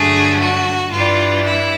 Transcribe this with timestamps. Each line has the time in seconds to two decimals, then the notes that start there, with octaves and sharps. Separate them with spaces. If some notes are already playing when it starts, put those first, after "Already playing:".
Already playing: G2 D3 F#3 A3 G#4
0.38 F#4
0.91 G2 E3 G3 F4
1.43 E4